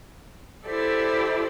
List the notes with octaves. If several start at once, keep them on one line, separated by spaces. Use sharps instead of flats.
E4 G4 A4 C5 D5